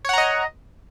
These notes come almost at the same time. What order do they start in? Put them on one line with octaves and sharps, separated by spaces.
C#5 F#5 A#5 D#5